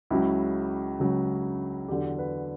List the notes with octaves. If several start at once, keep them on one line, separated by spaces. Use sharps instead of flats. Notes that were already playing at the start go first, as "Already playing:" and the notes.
C#2 C#3 F#3 E4
C#2 C#3 F#3
E2 D3 F#3 G4
B4